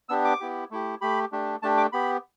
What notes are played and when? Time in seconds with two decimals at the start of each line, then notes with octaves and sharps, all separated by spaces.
0.09 B3 D4 G4 E6
0.24 D6
0.40 B3 E4 G4
0.71 A3 E4 G4
1.01 A3 G4 B5
1.32 A3 D4 G4
1.62 A3 D4 G4 A5
1.77 D6
1.92 B3 G4 B5